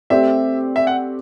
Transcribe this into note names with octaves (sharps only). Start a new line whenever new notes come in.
A3 C4 G4 D5 E5
E5
F#5